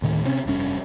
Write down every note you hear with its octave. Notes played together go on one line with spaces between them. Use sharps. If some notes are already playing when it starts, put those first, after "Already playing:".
D2 A2 D#3
C3 C4 C#4
F1 G2 C#4